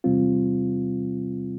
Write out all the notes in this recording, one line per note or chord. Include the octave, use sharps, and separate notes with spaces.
E2 C3 G3 C4 F4